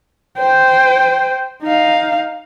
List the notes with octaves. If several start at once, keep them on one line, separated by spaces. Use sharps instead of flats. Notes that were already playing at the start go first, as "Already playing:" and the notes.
C5 G5
D#4 F5